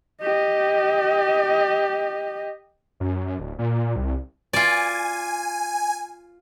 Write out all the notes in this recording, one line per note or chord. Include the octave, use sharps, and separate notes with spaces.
G4 D#5
F#2
D1
A#2
C2
F4 D5 G#5